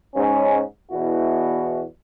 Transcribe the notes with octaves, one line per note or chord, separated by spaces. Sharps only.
G#2 C#4
E2 B2 E4 F#4